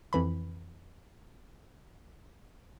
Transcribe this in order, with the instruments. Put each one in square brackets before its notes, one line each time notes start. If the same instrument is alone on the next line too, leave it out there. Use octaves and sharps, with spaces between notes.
[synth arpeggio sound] F2 E3 B5